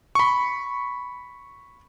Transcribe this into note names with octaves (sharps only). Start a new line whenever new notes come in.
B5 C#6